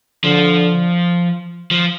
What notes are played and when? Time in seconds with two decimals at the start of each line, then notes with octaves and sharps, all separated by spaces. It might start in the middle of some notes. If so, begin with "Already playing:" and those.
0.24 D3 F3
1.71 F3